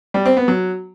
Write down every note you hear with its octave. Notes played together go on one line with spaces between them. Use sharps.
G3
C4
B3
F#3